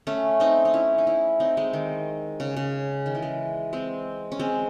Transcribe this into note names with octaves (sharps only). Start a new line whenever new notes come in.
A3 C#4
C4 D#4
D#4
C#4 E4
D#4
C#4 E4
C4 D#4
G#3 C4
D#3
C#3
C#3
D#3
E3
G#3
G#3 C4
C#4
G#3 C4